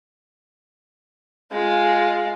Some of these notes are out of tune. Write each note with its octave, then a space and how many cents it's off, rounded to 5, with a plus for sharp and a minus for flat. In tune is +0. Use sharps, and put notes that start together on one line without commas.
G#3 +0 F4 +5